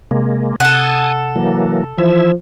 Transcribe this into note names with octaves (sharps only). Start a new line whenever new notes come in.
C3 G#3 A#3
C3 A4 F#5 G#5 A5 D#6
E3 F#3 A#3
E3 F3 E4 E5